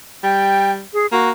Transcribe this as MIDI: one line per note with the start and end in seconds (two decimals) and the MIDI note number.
0.23 0.82 55
0.23 0.72 79
0.93 1.06 68
1.12 1.31 58
1.12 1.29 66